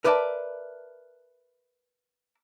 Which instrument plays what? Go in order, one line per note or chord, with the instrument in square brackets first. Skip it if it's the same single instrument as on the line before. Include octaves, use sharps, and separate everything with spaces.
[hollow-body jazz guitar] A#4 B4 D5 E5 G5 A5